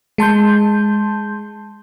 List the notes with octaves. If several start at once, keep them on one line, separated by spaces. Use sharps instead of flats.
G#3 A5 C6 G6